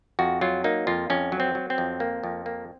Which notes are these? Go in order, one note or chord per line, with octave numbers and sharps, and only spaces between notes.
F2 F#4
F#3 F4
A#3 D#4
F2 F4
F2 C#4
F#3
C4
F#3
C4
F2
A#3
F2
A#3